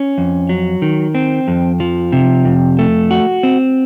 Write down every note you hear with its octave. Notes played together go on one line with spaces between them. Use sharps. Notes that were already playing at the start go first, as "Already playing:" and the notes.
Already playing: C#4
F2
F#3
D#3
C4
F2
F3
C3
F2
A3
F#4
C4